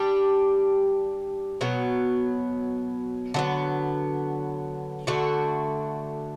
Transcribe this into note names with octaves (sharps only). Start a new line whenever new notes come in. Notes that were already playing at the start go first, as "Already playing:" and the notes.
Already playing: G3 D4 G4
B2 F#3 B3
D3 F#3 B3
D3 A3 D4 F#4